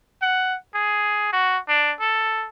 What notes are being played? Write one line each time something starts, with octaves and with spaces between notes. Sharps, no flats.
F#5
G#4
F#4
D4
A4